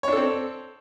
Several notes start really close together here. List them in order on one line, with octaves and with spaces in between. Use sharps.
C#5 D4 A4 C4